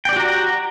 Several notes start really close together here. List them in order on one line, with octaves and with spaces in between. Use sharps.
G5 D5 G4 F#4 A#5